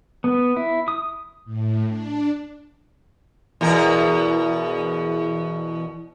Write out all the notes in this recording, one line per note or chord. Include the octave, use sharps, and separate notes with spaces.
B3
E4
D#6
A2
D4
E2 B2 A#4